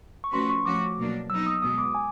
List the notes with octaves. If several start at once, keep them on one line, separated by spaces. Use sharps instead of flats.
C#6
F3 A3 C#4 F#4 B4 C6
C#6
F3 A3 C#4 F#4 D6
B2 F#3 A#3 D4
F#3 B3 D#4 E6
D#6
B2 G#3 B3 D#6
D6
G#5